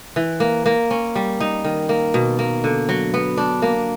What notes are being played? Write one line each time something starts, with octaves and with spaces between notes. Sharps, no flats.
E3
A#3
A#3
C#4
G3
D#4
D#3
A#3
B2
A#3
D3
F#3
B3
D4
A#3